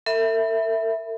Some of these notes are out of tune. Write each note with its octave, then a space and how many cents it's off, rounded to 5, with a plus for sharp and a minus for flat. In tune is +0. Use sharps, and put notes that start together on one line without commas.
A4 +45 E5 +0 B5 +0